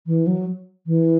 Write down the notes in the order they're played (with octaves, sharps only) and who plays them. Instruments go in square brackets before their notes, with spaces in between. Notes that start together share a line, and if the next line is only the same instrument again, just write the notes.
[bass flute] E3
F#3
E3